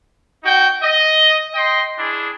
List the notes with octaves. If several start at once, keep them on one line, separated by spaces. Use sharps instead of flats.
D#4 F#4 G5
D#5
D#5 G5 C6
D4 E4 G#4